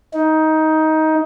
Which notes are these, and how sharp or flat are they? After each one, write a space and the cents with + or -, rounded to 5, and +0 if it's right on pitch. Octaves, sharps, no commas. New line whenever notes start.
D#4 +15